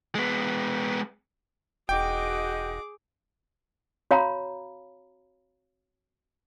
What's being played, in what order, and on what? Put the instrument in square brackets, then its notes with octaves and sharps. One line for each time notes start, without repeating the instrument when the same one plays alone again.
[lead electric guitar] G#3 B3
[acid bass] E1 [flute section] D#4 F#4 D#5 [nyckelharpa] G#4 D6 [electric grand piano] G5
[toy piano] F#4 C#5 F5 A#5 B5